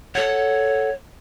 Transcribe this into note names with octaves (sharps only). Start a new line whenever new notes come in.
A4 C#5 F#5